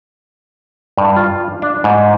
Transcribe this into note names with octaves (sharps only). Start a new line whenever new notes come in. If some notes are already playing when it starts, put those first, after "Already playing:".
G2
F4
D4
G#2